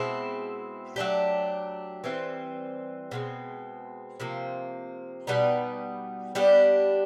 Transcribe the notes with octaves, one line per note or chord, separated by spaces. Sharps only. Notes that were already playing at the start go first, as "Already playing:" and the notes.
Already playing: B2 G#3 C4 E4
F#3 A3 D4 G4
E3 G3 C4
B2 G#3 C4
C3 F3 A#3
B2 G3 B3 D#4
G3 B3 D4 G4